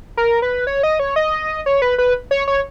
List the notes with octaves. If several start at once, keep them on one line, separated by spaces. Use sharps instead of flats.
A#4
B4
C#5
D#5
C#5
D#5
C#5
B4
B4
C#5
C#5